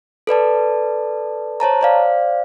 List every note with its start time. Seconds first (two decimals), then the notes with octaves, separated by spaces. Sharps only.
0.27 A4 B4 D5 A5
1.60 C5 C#5 A5 A#5
1.81 C5 D5 F5